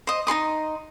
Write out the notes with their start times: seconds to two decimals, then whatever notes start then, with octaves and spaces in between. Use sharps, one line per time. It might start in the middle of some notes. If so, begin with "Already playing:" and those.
0.07 C5 D#5
0.27 D#4 A4 C6 D#6